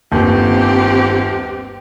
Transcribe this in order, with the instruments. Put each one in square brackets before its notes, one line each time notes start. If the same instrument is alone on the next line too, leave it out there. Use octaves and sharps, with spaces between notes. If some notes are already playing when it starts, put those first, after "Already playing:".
[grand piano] G1 D#2 [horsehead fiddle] C4 G4